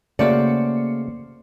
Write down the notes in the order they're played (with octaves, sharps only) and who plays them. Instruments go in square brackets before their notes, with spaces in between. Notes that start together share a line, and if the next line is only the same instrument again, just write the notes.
[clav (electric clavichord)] C#3 A3 F#4 [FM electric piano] A#3 C#7 [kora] C5 D5